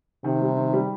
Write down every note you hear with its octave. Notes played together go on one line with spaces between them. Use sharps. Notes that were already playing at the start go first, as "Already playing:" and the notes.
C3 D#3
G3
D#3
G3